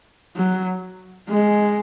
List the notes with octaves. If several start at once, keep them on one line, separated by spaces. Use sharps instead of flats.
F#3
G#3